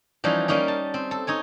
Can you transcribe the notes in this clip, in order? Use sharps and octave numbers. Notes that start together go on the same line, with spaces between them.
E3 F3 G3 C#4 D#4
G3 A#3 C#4 D#4
A5
C4
A4
D#4 C#5 G#5